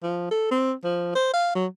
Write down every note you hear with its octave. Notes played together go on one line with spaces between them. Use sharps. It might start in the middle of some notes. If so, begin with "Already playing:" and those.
F3
A4
C4
F3
C5
F5
F#3